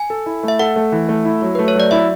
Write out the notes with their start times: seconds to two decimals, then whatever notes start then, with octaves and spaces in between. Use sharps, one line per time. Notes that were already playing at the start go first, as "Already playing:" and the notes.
Already playing: G#5
0.10 A4
0.26 E4
0.43 A3 E5
0.59 A4 F#5
0.76 A3
0.92 E3
1.09 A3
1.25 E4
1.42 F#3
1.55 A3 B4
1.68 C#5
1.75 F#3 D5
1.91 E4 E5